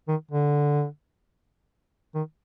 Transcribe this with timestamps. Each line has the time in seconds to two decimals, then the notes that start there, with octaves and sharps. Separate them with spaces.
0.08 D#3
0.31 D3
2.15 D#3